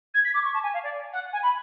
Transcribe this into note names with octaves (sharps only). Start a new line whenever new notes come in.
G#6
B6
D6
C#6
A5
G#5
F5
D5
F#5
G#5
B5